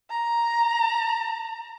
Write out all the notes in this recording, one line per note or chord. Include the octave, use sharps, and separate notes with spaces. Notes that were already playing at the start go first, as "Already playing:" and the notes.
A#5